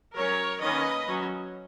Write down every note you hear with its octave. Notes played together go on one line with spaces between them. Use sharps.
F#3 C#4 A#4 C#5
D#3 A#3 C#4 B4 D#5
F#3 C#4